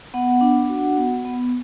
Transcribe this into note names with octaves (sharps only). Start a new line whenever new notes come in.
B3 F#5
D4
F#4
B3
B3